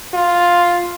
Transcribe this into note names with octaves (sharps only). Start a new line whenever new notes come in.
F4